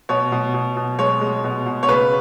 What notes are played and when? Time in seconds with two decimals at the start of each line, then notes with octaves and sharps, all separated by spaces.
0.09 B2 C#5
0.32 B2
0.54 B2
0.77 B2
0.99 G#3 C#5
1.21 G#3
1.44 B2
1.66 B2
1.83 C#5
1.89 C#3 B4